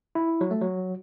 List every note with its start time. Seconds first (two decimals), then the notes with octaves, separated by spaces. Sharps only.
0.15 E4
0.41 F#3
0.51 A3
0.61 F#3